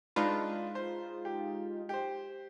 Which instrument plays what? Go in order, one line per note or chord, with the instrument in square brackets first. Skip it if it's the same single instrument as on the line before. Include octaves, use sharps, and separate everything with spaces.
[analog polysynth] G#3 D#4 F4 [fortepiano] D4 B4
[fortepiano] C5
G4
G4 C5